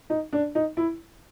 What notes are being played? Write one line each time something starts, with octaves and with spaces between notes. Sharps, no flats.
D#4
D4
D#4
E4